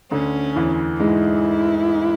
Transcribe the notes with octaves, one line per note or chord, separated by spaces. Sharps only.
D2 D3 C#4
E2 E3
G#2 G#3 E4